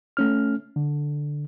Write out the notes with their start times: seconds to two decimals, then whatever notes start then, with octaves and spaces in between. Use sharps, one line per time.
0.17 A3 C#4 F6
0.76 D3